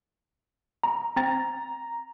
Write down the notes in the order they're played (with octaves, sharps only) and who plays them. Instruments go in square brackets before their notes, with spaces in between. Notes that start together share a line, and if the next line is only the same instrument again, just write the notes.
[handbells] A#5
[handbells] C4 G5 A6 [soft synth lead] A#5